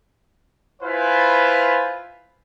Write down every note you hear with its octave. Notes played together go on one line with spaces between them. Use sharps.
E4 F4 B4 C5 F5 G#5